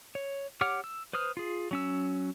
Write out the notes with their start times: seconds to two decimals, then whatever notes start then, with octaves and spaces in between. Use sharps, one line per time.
0.15 C#5
0.61 G4 C#5 F#5 D6 F6
0.84 E6
1.13 B4 C5 D#6 F6
1.37 F4 G#4
1.71 F#3 C#4 E6